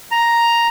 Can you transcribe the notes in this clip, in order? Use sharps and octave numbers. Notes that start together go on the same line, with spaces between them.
A#5